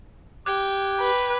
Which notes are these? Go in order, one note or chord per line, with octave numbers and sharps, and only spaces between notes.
G4 G5 D6 F#6 G#6
B4